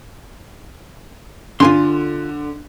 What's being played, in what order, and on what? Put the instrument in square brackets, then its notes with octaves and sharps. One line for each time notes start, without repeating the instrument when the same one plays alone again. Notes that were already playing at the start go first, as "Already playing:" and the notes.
[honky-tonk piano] D3 [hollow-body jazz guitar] F4 G#5 C6